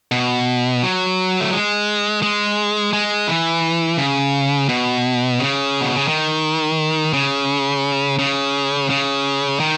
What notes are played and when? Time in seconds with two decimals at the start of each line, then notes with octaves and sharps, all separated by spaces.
0.12 B2
0.83 F#3
1.41 A3
1.52 G#3
2.23 G#3
2.93 G#3
3.27 E3
3.98 C#3
4.69 B2
5.39 C#3
5.81 B2
5.95 C#3
6.08 D#3
7.13 C#3
8.19 C#3
8.90 C#3
9.60 D#3